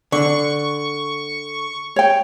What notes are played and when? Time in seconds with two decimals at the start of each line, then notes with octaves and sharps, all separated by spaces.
0.12 D3 C#6
1.96 C#5 G5